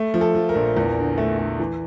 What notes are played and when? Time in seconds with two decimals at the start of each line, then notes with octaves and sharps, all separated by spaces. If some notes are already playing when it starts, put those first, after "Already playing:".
Already playing: A3
0.14 F3
0.21 A4
0.35 F3
0.49 A#4
0.55 A#1
0.77 E2
0.97 D3
1.18 A3
1.39 A3
1.60 E3